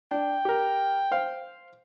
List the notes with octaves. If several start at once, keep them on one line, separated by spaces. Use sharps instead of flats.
D4 G5
G4 A#4
C5 F5